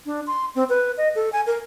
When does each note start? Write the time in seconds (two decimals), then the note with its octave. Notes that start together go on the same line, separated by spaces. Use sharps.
0.06 D4
0.27 C6
0.55 C4
0.69 B4
0.97 D#5
1.15 A4
1.33 G#5
1.46 A#4